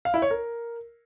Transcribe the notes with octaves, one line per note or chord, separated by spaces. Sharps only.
F5
E4
C#5
A#4